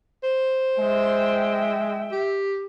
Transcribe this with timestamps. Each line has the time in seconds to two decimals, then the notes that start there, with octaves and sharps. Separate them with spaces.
0.23 C5
0.79 G#3 E5 G5
2.11 G4